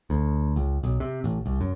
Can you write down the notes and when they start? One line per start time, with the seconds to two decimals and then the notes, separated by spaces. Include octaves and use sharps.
0.10 D2
0.56 C#2
0.84 B1
1.00 C3
1.24 A1
1.46 C2
1.61 F#2